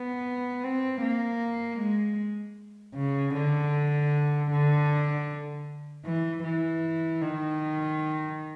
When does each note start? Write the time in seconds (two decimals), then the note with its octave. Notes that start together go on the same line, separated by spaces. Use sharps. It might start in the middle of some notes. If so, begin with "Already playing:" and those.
Already playing: B3
0.64 C4
1.02 A#3
1.79 G#3
2.95 C#3
3.34 D3
4.51 D3
6.05 E3
6.43 E3
7.21 D#3